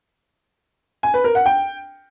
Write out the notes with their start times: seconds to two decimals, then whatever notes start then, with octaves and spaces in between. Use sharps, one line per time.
1.03 G#5
1.14 B4
1.24 A#4
1.35 F#5
1.46 G5